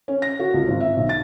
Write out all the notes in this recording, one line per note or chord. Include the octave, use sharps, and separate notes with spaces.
C#4
A#6
F#4
C#2
G#1
E5
B1
A6